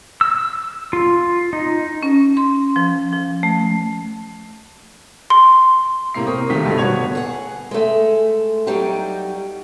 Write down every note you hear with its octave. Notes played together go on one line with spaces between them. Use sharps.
E6
F4
D#4
C#4
C6
F3
F3
A3
C6
A2 C3 A#3 A#5 C7
C4 A#4 C#6 D#6
C#2 D#3 A3 G4 G5 B6
G2 B2 D3 A3
D#1 B3 F#4 C#5 G#6 F7
G#4 F#5
G#3 A3
F#3 G3 D#4 G4